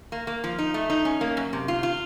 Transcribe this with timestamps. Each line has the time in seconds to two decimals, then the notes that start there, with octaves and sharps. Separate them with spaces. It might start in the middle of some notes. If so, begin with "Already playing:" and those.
0.12 A#3
0.27 A#3
0.44 F3
0.59 D#4
0.74 A3
0.90 D#4
1.05 C#4
1.21 A#3
1.37 F#2
1.53 C3
1.68 F4
1.83 F4